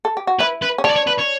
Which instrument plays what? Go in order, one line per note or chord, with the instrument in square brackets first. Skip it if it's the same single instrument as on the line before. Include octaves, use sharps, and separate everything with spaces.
[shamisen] A4
G4
F#4
[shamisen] E4 [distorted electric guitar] B4
[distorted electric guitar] B4
[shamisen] C#4
[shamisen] D4 [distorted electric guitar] C#5
[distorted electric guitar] D5
C#5
B4
C#5